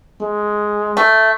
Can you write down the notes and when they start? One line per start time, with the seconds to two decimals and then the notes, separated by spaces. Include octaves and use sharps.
0.20 G#3
0.97 A3